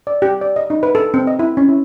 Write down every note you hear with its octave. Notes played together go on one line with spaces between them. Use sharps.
D5
G4
D5
D#5
D#4
B4
A4
C4
D#5
E4
C#4
E4